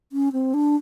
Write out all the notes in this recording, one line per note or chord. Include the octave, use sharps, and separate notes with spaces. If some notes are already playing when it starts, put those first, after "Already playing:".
C#4
C4
D4